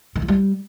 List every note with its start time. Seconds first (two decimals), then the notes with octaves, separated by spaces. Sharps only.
0.15 D#3
0.22 E3
0.28 G3